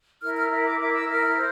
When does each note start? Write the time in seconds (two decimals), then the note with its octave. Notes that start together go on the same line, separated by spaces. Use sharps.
0.21 E4 A#4 F6
0.35 F6
0.50 E4 A#4 A#5
0.64 D6
0.79 E4 A#4 D6
0.93 E6
1.08 E4 A#4 F6
1.37 C5